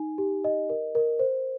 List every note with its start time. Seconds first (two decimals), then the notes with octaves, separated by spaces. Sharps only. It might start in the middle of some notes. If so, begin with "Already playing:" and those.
Already playing: D#4 G#5
0.18 G4
0.44 D#5
0.70 A#4
0.95 A#4
1.19 C5